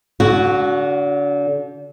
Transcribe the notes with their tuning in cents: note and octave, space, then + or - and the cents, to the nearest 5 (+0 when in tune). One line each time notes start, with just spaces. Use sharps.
D3 -35 F#4 +0